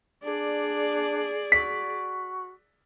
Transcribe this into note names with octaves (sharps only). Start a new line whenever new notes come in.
D4 G#4 D5
F#4 B6